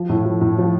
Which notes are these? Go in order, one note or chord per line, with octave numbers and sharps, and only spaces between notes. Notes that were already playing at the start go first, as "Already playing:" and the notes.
Already playing: F3
A2
F3
A2
F3